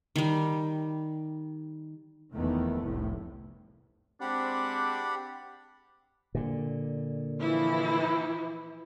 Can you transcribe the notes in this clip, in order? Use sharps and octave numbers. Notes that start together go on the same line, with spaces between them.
D#3 G3
F1 E2 D#3 E3 A3 B3
F1 C2 A2
G#3 C4 D4 G4 F#5 B5
A#2 D3
E3 F3 E4